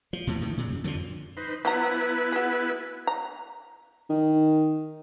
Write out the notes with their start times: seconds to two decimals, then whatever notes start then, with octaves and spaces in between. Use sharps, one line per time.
0.13 F3
0.27 D#2 A2 C3
0.41 A2 D#3
0.57 A#2 C#3
0.72 F#2
0.84 F2 D3 D#3 F3
1.37 D#4 B4 C5
1.65 F3 F#3 B3 E4 B4 A#5
2.32 F#4 G#4
3.07 A#5
4.10 D#3